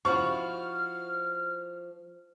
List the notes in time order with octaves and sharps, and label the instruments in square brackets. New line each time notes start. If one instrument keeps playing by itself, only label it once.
[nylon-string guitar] F3 E4 F#4 [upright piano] C#6 [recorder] F6